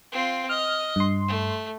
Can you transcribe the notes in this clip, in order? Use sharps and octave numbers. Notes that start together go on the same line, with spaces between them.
C4 F4
D#5 F6
G2 C6
A3